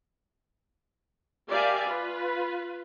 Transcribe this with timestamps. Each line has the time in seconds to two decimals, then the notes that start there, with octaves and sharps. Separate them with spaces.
1.49 G4 A#4 D5 E5 F5 G#5
1.86 F4 B4